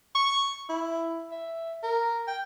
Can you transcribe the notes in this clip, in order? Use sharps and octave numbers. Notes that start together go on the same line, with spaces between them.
C#6
E4
E5
A#4
G5